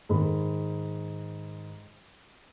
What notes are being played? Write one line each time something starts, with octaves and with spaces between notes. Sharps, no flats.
G#2 D#3 B5